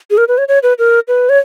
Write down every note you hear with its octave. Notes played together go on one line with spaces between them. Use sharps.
G#4
A#4
B4
C#5
C#5
B4
A#4
B4
C#5